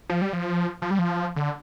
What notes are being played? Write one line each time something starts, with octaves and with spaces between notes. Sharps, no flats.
F3
G3
F3
F3
G3
F3
D3